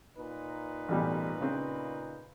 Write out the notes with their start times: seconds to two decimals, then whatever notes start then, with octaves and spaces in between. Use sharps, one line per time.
0.17 A#2 D#4 B4
0.89 A1 B2 G3
1.41 C#3 C4